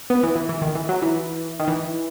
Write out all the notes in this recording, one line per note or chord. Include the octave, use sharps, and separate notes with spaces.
B3
E3
E3
E3
D#3
E3
F#3
E3
D#3
E3